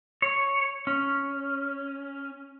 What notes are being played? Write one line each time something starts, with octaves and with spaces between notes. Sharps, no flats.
C#5
C#4